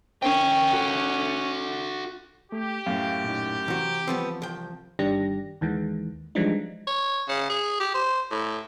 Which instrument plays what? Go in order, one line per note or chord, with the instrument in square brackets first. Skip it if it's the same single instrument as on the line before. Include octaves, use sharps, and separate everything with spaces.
[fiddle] C#4 [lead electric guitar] A#4 G5
[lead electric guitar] F#4 A4
[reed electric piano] A3 [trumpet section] G4
[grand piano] F#2 A2 [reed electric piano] F5
[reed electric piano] A#2 D#4
[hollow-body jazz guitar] C3 F#4 [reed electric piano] E3
[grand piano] F3 [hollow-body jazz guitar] G3 B3 C4
[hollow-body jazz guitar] C2 G5
[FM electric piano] G1 D#3 G3 D4 G4 A#6
D#2 D#3 E3 G#3
E3 F3 G3 G#3 D4 D#4
[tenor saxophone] C#5
C#3
G#4
G4
C5
A2